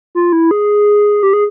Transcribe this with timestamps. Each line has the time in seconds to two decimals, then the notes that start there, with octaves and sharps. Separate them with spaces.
0.15 F4
0.33 E4
0.51 G#4
1.23 G4
1.33 G#4